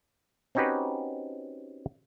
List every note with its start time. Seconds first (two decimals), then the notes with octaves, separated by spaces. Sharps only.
0.55 C4 C#4 D#4 F#4 G4 B4